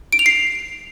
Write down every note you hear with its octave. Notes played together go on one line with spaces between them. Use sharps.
D7
F7
C7